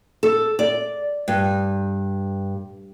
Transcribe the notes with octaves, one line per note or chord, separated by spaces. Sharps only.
A4
D5
G2